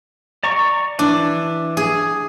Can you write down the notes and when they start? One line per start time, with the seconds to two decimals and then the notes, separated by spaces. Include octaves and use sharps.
0.43 D5 A#5 C#6
0.99 E3 D4
1.77 G#4